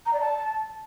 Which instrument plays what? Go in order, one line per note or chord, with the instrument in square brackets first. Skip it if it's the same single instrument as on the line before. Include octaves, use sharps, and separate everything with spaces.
[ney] A#5
D5
A5